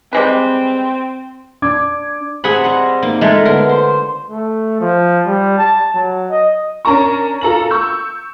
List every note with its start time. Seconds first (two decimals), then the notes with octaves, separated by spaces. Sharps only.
0.13 G3 G#3 C4 B4
1.62 D4 D6 G#6
2.44 C3 G#4 F#5 B5 C6
2.64 G3 D#5 F#5 A#5
3.03 A#3 D#4
3.21 G#3 A3 F4 A#4 A#5
3.45 D3 B3 A#4
3.69 C5
4.28 A3
4.80 F3
5.26 G3
5.58 A5
5.94 F#3
6.30 D#5
6.85 C#4 D4 A#4 A#5 C#6
7.41 F4 A4 A#5 F#7
7.71 C#6 E6 G6